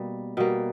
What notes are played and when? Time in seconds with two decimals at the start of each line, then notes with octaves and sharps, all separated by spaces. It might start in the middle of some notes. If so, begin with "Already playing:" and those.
Already playing: B2 G3 A#3
0.37 B2 G3 A#3